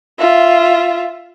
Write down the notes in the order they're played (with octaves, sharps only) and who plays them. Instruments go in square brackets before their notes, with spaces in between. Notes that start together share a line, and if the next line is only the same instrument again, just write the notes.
[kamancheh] F4 E5